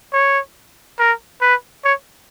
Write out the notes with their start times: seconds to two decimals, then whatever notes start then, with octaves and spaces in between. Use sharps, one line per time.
0.13 C#5
0.99 A#4
1.42 B4
1.85 C#5